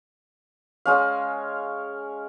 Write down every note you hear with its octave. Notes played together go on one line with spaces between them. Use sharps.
G#3 C#4 F5